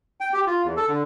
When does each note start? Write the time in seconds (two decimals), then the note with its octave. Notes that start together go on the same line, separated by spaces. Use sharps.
0.20 G5
0.33 G4
0.46 F4
0.64 E2
0.77 A4
0.88 D3